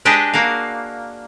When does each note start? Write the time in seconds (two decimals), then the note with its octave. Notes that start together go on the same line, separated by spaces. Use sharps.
0.05 G#3 D4 G4 G#4 B4 D#5
0.33 A#3 F#4 F5